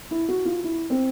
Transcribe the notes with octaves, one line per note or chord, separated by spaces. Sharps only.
E4
F#4
F4
E4
C4